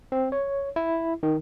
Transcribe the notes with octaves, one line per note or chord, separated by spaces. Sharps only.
C4
C#5
E4
D#3